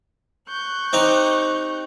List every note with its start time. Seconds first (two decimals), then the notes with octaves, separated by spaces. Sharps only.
0.48 C#6 F#6 G6
0.93 C4 D#4 G4